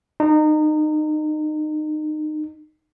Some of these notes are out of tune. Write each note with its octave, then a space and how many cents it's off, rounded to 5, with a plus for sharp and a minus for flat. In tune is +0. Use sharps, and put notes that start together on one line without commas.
D#4 -25